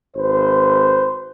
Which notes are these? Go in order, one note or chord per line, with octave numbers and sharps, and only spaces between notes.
G#1 B4 C5